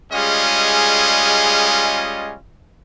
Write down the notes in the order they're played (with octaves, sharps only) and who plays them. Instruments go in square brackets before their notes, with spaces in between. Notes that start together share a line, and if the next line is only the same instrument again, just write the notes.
[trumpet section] G3 G#3 C#4 F4 G#4 D#5